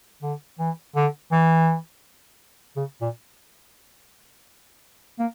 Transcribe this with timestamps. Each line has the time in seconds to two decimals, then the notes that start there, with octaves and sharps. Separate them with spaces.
0.22 D3
0.59 E3
0.96 D3
1.32 E3
2.77 C#3
3.01 A#2
5.19 A#3